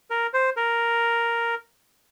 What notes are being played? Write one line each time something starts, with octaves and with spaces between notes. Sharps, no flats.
A#4
C5
A#4